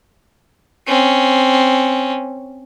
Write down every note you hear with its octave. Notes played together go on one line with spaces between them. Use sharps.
C4 C#4